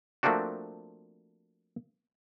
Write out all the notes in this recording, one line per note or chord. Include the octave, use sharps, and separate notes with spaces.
F3 A3 A#3 C4 D4 F#4